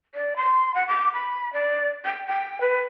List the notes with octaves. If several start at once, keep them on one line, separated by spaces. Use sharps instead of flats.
D5
C6
F#5
D6
B5
D5
G5
G5
B4